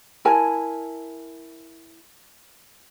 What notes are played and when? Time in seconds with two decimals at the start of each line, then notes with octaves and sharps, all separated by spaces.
0.25 E4 A#4 G#5 A5